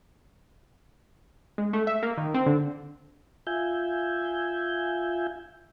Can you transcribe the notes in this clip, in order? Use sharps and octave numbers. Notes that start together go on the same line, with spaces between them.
G#3
A3
E5
A#3
D#3
C4
D3
F4 E5 G#5 G6